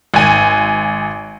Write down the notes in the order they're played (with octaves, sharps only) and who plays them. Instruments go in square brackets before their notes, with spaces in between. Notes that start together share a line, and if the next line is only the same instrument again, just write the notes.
[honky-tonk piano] G#1 G#5